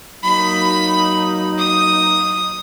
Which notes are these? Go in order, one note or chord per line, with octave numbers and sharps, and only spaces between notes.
F#3 A#3 D#4 B5
D#6